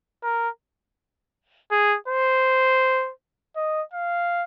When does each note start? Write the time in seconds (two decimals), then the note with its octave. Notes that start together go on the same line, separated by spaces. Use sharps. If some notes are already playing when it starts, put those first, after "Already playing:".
0.23 A#4
1.71 G#4
2.08 C5
3.56 D#5
3.93 F5